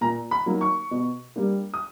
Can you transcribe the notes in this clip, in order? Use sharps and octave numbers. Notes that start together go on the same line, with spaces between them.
A#2 A#5
B5
F#3 A#3 D#4
C#6
B2
G3 A#3 D4
D#6